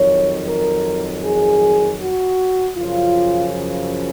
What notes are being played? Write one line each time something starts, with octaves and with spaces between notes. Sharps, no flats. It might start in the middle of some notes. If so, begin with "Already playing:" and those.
Already playing: F2 D#3 F#3 C#5
A#4
G#4
F#4
F#2 C#3 F3 F4